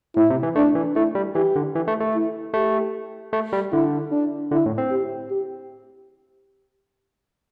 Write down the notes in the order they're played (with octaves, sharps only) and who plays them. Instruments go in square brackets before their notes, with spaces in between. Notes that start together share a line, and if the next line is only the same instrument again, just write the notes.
[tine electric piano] A2 [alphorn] E4
[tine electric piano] C3
E3
[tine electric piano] A3 [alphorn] D4
[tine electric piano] E3
[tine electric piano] A3 [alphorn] E4
[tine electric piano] G3
[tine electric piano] E3 [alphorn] G4
[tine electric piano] D3
E3
A3
A3
[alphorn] E4
[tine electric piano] A3 [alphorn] G4
[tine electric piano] A3
G3
[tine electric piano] D3 [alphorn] E4
[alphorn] D4
[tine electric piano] D3 [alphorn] E4
[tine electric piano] A2
C4
[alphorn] G4
G4